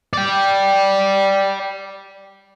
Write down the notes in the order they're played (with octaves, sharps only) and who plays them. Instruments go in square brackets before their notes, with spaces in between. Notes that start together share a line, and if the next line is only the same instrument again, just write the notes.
[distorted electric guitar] D5 G5